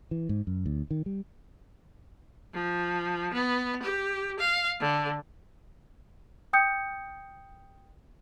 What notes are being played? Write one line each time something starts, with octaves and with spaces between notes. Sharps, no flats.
E3
G#2
F#2
D2
D#3
G3
F3
B3
G4
F5
D3
G5 D#6 G6 C#7